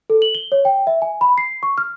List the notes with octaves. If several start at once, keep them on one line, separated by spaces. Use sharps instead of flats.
A4
F#7
G7
C#5
G5
E5
G#5
B5
C7
C#6
F6